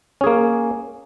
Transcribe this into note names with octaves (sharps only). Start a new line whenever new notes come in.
A#3 C#4 G#4